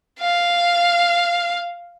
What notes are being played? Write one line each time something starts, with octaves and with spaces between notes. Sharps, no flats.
F5